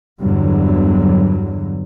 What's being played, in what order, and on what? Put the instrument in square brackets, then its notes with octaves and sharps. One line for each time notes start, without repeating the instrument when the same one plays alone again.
[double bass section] E2 G2 D3 F#3